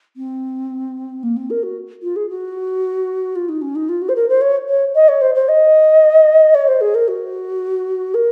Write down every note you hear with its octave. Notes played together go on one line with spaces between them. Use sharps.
C4
A#3
C4
A#4
F#4
F4
G#4
F#4
F4
D#4
C#4
D#4
F4
F#4
C5
A#4
C5
C#5
C#5
D#5
C#5
C5
C5
D#5
C#5
C5
G#4
A#4
F#4
A#4